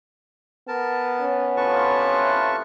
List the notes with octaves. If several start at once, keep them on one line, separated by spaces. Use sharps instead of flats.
B3 A#4 A5
C#4
A2 C3 F4 B4 A5 C#6